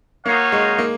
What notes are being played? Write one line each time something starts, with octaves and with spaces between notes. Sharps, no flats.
A#3 D#4 F#4 C#5 F5
G#3
A#3